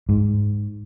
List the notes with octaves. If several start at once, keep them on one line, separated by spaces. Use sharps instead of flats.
G#2